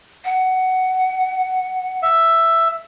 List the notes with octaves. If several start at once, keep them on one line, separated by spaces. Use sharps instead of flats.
F#5
E5